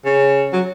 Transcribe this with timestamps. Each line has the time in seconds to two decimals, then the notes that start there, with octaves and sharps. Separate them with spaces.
0.05 C#3
0.53 F#3